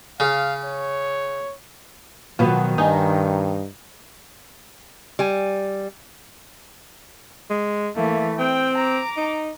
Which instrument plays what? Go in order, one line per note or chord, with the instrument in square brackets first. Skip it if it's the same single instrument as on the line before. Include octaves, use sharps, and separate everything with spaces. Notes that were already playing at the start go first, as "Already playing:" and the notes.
[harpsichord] C#3 [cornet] F5
[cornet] C#5
[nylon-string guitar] B2 F#3 B4 [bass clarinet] D#3 [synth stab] F3 B3
[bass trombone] G2 [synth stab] D#4 [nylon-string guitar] G#5
[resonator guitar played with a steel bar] G3 G#5
[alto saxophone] G#3
[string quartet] E3 A3 [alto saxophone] A#3
[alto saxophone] C4 [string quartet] G5
[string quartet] A#5 D6
[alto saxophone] D#4